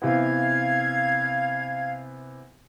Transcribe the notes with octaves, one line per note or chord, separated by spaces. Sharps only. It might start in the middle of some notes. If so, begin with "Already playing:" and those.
C3 E3 B3 F5 G#6